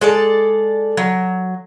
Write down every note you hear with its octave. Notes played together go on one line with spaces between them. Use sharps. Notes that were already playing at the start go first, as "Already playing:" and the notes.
G#3 A4 D5
F#3